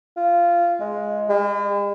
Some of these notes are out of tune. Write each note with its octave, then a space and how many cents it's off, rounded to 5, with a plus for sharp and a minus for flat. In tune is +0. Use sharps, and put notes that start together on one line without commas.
F4 -15
G#3 +10
G#3 -45